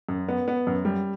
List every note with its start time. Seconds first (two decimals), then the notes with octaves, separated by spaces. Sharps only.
0.09 F#2
0.28 B3
0.48 B3
0.67 F#2
0.85 G3